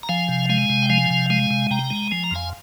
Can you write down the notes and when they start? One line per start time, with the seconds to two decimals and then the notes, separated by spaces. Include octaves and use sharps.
0.03 A#5
0.09 F3 F5 G#5
0.28 C3
0.49 G#3 F5 G#5
0.70 C3
0.83 G5
0.90 F3 F5 G#5
1.10 C3
1.30 G#3 F5 G#5
1.51 C3
1.71 C3 G5 A#5
1.90 G#3
2.11 F3 G#5
2.24 A#5
2.31 F2 F5 G#5